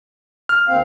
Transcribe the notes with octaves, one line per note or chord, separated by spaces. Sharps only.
F6
D#2 C4 F5